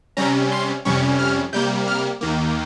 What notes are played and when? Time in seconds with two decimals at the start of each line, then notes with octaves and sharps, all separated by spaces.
0.17 C3 G3 C#4 A#5
0.52 C6
0.85 F2 C3 G3 C#4 C#6
1.19 F6
1.53 C3 G3 A#3 G6
1.88 F6
2.21 D#2 D#3 A#3